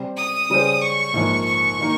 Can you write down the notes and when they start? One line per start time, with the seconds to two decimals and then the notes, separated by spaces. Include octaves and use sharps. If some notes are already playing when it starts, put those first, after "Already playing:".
Already playing: C3 G3 C4 G4
0.17 D#6
0.50 C#3 G3 C#4 G#4 C5
0.81 C#6
1.14 A#1 G#2 F3 A#3
1.45 C#6
1.79 D#3 A#3 D#4